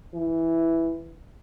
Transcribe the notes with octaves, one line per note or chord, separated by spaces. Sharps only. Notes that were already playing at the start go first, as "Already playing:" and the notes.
E3